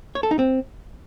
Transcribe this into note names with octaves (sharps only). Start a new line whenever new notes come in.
C#5
A4
D#4
C4